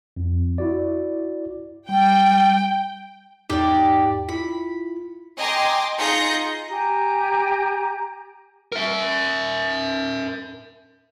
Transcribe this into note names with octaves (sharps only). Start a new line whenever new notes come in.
F2
E4 F#4 D5
G3 G5
E2 G#2 D#4 G4 D5
E4 F4 B5
D#5 G5 G#5 A#5 C6 D6
D#4 F4 G#4 G6 A#6 C#7
G4 G#5 A#5
A#4 E5